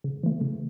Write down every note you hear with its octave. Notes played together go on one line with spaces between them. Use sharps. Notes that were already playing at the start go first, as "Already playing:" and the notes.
C#3
E3 A3
C#3